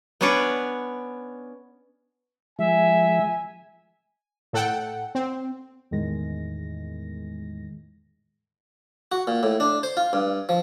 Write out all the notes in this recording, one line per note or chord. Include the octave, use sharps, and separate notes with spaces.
B3 C#4 D4 B4 C#5 D5
F3 G#3 E5 G#5
A2 A4 F#5 G5
C4
E2 A2 D#3 G#3 A#6
F#4
A#2
A2
D4
C5
F4
G2
F3